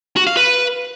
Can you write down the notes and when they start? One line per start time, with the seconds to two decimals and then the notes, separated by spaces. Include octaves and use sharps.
0.16 F#4
0.27 F5
0.37 B4